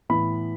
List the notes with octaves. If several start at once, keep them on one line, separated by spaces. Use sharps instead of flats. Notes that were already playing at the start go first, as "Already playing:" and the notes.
A2 E3 B3 B5